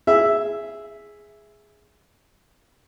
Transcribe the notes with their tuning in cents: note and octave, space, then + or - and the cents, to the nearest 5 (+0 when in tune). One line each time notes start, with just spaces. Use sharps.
G#4 +0 E5 +0